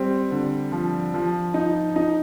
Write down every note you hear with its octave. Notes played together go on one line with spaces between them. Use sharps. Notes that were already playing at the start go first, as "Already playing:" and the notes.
Already playing: G3 C4
D3
F3
F3
D#4
D#4